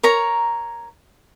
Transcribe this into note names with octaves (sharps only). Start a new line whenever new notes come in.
A#4 C#5 A#5